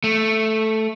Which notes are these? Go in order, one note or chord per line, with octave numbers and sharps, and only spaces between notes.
A3